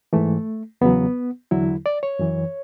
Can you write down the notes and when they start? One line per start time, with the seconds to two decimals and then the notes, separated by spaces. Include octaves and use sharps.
0.13 G#2 E3 A3
0.81 E2 C#3 F#3 B3
1.51 E2 D3 F#3 E4
1.86 D5
2.03 C#5
2.19 F#2 E3